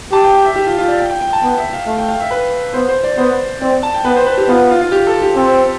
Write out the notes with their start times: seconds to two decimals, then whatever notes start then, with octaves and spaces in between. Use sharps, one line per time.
0.12 G4 A5
0.24 G5
0.34 G5
0.45 E5
0.56 G4
0.66 F4
0.78 F4
0.88 D5
0.99 G5
1.10 G5
1.21 G5
1.33 A5
1.43 B3 G5
1.57 E5
1.73 F5
1.87 A3 F5
1.98 G5
2.08 F5
2.20 E5
2.31 B4
2.73 B3 C5
2.89 C5
3.04 D5
3.17 B3 C5
3.61 C4 D5
3.83 A5
3.94 G5
4.05 B3 B4
4.16 C5
4.27 B4
4.37 G4
4.48 B3 F4
4.71 F4
4.81 F4
4.92 G4
5.07 A4
5.22 G4
5.36 C4